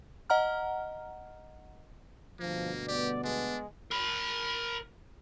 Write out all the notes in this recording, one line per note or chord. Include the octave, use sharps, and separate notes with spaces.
D#5 F#5 A#5 F6
D2 G2 B2 F3 A#3
B3 G4 D5
G#3 D4
A#4 B5